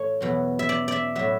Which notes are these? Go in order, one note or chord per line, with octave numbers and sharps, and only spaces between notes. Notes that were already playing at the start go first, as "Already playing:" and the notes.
Already playing: A2 E3 A4 C#5
E2 B2 F#3
E5
D5
D5 E5
A2 F#3 E5